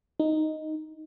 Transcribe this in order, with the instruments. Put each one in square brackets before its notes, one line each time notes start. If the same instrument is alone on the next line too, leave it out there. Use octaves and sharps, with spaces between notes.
[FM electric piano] D#4